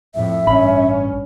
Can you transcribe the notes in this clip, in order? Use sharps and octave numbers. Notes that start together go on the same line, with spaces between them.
F2 A2 E5
A1 G2 C#4 B5